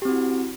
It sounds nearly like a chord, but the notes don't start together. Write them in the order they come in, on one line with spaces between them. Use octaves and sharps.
G4 C4 F#4 E4